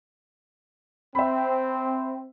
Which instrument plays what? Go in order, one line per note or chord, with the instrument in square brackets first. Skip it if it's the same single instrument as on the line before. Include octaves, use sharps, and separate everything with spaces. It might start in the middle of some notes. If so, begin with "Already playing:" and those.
[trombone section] C4 [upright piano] E5 B5